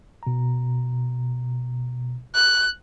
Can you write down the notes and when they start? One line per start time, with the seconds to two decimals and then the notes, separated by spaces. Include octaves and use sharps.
0.23 B2 A#5
2.35 F#6